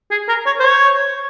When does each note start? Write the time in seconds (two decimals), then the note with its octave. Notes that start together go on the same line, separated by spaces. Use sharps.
0.11 G#4
0.28 A#4
0.46 C#5
0.60 C5
0.63 C#5